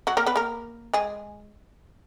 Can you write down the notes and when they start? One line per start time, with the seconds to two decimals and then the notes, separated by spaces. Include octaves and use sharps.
0.07 F#3 F#4
0.17 A#3 A#4
0.26 B3 B4
0.36 A#3 A#4
0.94 G#3 G#4